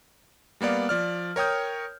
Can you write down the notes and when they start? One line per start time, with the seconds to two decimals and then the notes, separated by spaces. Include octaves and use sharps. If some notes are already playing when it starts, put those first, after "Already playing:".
0.61 G3 A#3 B3 D5 F5
0.89 F3 D5 F6
1.36 A#4 C#5 G5 D#6 G6